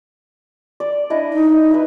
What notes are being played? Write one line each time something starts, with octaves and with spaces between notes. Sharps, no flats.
D5
D4 E4 D#5
D#4
B4 E5